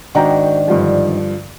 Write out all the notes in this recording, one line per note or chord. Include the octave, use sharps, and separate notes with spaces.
G#2 D#3 D4 F#4 G5 A#5
G2 D3 F3